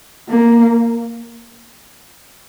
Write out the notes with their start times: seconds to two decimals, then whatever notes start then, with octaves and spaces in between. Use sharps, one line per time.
0.29 A#3